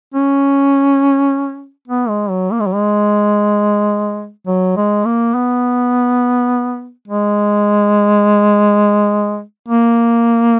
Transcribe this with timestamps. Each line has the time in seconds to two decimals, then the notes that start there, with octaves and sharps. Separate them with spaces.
0.14 C#4
1.88 B3
2.09 G#3
2.30 F#3
2.52 A#3
2.60 G#3
2.67 F#3
2.74 G#3
4.47 F#3
4.77 G#3
5.05 A#3
5.35 B3
7.08 G#3
9.68 A#3